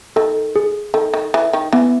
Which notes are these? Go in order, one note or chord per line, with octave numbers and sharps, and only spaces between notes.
D#3 A4
G#4
D#3 A4
D#3
E3
D#3
E3 B3